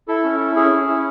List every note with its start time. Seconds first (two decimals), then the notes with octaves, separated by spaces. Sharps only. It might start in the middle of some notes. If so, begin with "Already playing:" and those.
0.08 E4 A4
0.24 C#4
0.40 E4
0.56 C#4 G#4
0.71 C#4
0.88 E4